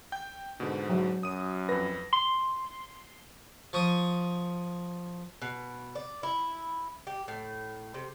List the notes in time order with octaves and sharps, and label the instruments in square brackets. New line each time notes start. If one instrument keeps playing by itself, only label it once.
[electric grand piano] G5 G6
[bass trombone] G#2 [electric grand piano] B2 D3
[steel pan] F#3
[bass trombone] F#2 [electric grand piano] D#6 D#7
[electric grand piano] F2 A#6 [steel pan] B4
[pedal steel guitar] C6
[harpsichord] F3 C#6 D#6
[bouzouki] B2
D5
E4
G4
A2
C3